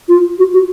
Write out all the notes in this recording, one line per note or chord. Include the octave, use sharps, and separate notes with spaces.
F4
F#4
F#4